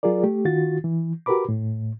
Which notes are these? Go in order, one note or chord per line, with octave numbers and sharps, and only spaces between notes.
F#3 F4 G#4 A#4 D5
A3 G4
D#3 F4 F#4 A6
E3
F#4 G4 A#4 B4 B5 D6
A2